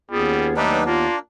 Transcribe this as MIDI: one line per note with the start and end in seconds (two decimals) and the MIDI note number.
0.11 1.06 39
0.11 0.47 55
0.11 1.06 59
0.11 0.56 61
0.11 0.56 65
0.11 0.56 68
0.56 0.85 54
0.56 0.81 55
0.56 0.85 57
0.56 0.84 62
0.56 0.84 63
0.56 0.84 71
0.86 1.17 58
0.86 1.19 62
0.86 1.15 65